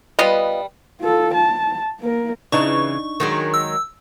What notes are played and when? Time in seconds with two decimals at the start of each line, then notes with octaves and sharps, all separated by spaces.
0.19 G3 B3 F4 B4 D#5
1.01 F4 A4
1.34 A5
2.00 A#3 A#4
2.52 C#3 E3 D4 D#4 C#6
3.20 D#3 F#3 G#3
3.54 E6